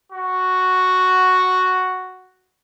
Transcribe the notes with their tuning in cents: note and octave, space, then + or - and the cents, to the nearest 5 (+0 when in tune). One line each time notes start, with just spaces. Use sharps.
F#4 +0